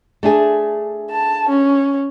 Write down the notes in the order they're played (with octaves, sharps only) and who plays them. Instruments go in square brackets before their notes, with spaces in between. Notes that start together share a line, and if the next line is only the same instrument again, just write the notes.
[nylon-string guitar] A3 D4 G#4
[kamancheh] A5
C#4